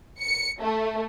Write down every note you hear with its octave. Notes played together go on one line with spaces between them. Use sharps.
C#7
A3